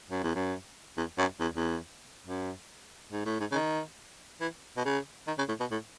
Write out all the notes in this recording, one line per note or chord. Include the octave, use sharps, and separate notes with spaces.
F#2
E2
F#2
E2
F#2
E2
E2
F#2
G#2
A2
G#2
C#3
D#3
E3
B2
C#3
D#3
C#3
A2
B2
A2